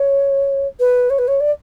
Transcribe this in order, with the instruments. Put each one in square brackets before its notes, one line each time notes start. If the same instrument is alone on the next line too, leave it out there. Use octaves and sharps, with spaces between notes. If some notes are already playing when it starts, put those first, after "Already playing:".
Already playing: [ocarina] C#5
B4
C#5
B4
C#5
D5